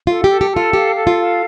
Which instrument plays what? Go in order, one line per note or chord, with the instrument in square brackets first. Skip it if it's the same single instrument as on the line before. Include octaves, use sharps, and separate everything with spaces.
[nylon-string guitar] F4 [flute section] A4
[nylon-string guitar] G4
[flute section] A4
[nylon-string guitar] G4
[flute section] A4
[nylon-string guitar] F4
[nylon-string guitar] G4 [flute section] F5
[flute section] A4
[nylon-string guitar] F4
[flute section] F5